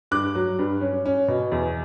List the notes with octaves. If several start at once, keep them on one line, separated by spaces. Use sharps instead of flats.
G2 D6 F#6
F#3
G2
C#4
C#4
B2
E2